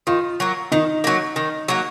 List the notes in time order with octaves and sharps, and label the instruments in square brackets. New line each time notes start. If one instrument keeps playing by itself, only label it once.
[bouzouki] D#3 [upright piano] F4
[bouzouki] F#3 A#3
[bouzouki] D#3 [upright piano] D#4
[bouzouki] F#3 A#3
D#3
F#3 A#3